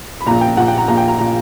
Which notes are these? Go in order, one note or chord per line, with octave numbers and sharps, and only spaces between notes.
B5
A#1 A#2 A#5
G5
A#1 A#2 F#5
G5
A#5
A#1 A#2 A#5
G5
A#5
A#2 A#5